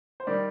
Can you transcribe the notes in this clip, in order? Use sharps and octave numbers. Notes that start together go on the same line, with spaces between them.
C5
D#3 G3 D5